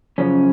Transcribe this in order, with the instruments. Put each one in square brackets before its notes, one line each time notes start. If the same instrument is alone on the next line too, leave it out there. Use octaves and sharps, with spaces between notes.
[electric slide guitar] F#2 C#3 F3 C#4